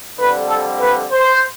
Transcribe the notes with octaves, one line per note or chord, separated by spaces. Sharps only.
F2 D3 G3 B4
A4
B4
C5